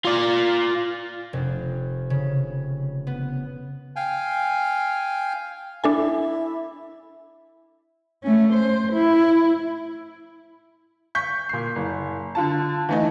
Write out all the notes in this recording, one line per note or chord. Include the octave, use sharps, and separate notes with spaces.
F4 D5
F1
C#3
B3
F5 G5 G#5
D4 E4 A4 G#5
A3 C#4
C5
E4
C#6 G6 B6
A#2 C7
F#1
D3 F4 A5
E3 A3 D#4